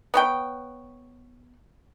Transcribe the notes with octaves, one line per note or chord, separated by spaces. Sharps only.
B3 C#5 G5